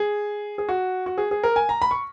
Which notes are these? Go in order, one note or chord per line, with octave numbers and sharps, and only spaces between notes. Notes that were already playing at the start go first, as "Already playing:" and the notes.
Already playing: G#4
G#4
F#4
F#4
G#4
G#4
A#4
G#5
A#5
B5
C#6